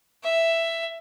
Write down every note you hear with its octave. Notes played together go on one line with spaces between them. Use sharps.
E5